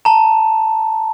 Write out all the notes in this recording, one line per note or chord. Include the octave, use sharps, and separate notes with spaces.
A5 A#5